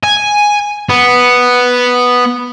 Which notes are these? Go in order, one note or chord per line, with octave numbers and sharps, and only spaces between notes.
G#5
B3